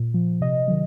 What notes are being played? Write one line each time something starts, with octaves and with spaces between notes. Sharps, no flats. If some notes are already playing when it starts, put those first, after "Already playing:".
Already playing: A#2
F3
C3 D#5
D#3 F#3